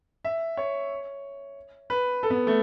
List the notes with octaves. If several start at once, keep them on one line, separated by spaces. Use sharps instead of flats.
E5
C#5
B4
A4
B3
A3